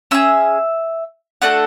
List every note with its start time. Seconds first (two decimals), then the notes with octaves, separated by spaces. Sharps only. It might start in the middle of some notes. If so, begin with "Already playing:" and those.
0.11 C#4 G#4 E5 E6
1.42 A3 D4 F#4 A4 F#5 F#6